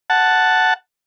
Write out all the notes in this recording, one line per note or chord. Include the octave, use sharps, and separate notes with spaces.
F#5 A5